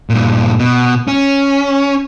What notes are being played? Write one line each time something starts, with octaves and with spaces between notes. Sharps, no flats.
G2 A#2
B2
C#4